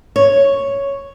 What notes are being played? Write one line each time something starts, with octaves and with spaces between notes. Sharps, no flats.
C#5